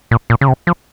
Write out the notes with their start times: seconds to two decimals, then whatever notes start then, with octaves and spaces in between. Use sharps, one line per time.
0.11 A#2
0.30 A#2
0.41 C#3
0.48 C3
0.67 F3